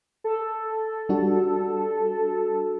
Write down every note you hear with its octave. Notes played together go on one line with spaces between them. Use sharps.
A4
G3 D4 F#4